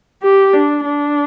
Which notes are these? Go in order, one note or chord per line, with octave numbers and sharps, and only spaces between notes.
G4
D4
D4